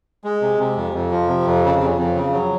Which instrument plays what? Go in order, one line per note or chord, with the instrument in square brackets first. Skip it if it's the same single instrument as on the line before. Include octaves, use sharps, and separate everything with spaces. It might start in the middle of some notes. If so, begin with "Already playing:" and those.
[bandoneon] G#3
C3
C3
F2
F2
F3
C3
F2
C#3
F2
F2
C#3
F#3